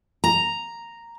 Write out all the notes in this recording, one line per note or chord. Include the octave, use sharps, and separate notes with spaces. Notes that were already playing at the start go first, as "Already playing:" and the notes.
A#5